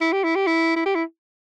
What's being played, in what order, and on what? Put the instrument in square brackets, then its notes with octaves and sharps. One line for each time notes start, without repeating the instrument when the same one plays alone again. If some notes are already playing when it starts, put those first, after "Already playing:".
[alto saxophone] E4
G4
E4
G4
E4
E4
G4
E4